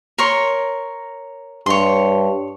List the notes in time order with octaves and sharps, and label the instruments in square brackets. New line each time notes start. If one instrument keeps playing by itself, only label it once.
[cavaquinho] A#4 C#5 C6
[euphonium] G2 [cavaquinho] C#5 C6